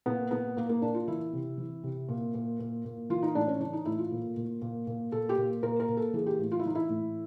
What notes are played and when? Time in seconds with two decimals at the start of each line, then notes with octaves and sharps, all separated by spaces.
0.06 A#2 B3
0.31 A#2 B3
0.57 A#2 A#3
0.69 A#3
0.82 A#2 D4
0.94 F4
1.08 E3 E4
1.33 C3
1.58 E3
1.83 C3
2.09 A#2
2.34 A#2
2.59 A#2
2.85 A#2
3.10 E3 F4
3.23 D#4
3.35 A2 D4
3.47 C#4
3.60 E3 D4
3.73 D#4
3.85 A2 E4
3.99 F4
4.11 A#2
4.37 A#2
4.62 A#2
4.87 A#2
5.12 A#2 A4
5.29 G4
5.37 A#2
5.62 A#2 A#4
5.80 A#4
5.89 A#2
5.97 A4
6.14 E3 G#4
6.26 G4
6.39 A2
6.52 F4
6.59 E4
6.64 E3 D#4
6.75 E4
6.89 A2